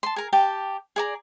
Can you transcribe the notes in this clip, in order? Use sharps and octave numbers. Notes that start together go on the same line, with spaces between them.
A5 C6
G#4 A#4
G4 G5 A5
G#4 D5 A#5